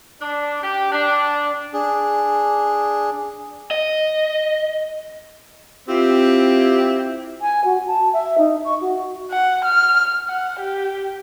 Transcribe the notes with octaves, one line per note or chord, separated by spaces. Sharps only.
D4
G4
D4
D4 G#4
D#5
C4 E4 F4 G4
G#5
F#4
A5
E5
D#4
C#6
F#4
F#5
F6
F#5
G4